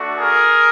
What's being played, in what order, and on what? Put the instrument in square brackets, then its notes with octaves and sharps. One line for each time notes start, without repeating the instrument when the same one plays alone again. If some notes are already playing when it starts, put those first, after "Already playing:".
Already playing: [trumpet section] A3 D4 F#4
G#4 A#4